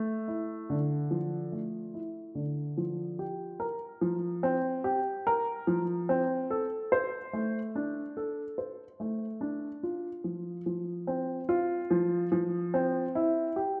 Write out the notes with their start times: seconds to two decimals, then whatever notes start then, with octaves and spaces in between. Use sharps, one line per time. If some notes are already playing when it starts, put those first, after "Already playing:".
Already playing: A3
0.28 E4
0.70 D3
1.11 F3
1.52 A3
1.94 E4
2.35 D3
2.77 F3
3.19 G4
3.60 A#4
4.01 F3
4.43 C4
4.84 G4
5.27 A#4
5.67 F3
6.09 C4
6.50 A4
6.92 C5
7.33 A3
7.75 D4
8.17 A4
8.58 C5
9.00 A3
9.41 D4
9.83 F4
10.24 F3
10.66 F3
11.07 C4
11.49 F4
11.91 F3
12.32 F3
12.74 C4
13.15 E4
13.56 G4